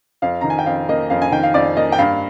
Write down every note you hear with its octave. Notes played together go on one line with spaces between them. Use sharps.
F2 F5
D#3 A#5
G#5
G5
F2 F5
A#3 D#5
F2 F5
G#5
D#3 G5
F5
F2 D5
A#3 D#5
G5
G2 F5